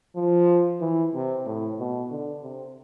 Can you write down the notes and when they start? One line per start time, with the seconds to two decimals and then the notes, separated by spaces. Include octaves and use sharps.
0.16 F3
0.81 E3
1.14 C3
1.46 A2
1.79 B2
2.11 D3
2.43 C3